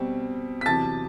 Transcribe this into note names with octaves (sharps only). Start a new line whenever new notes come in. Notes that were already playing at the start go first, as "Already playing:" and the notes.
Already playing: B2 G3 C4
B6
E2 C3 F#3 A5 A6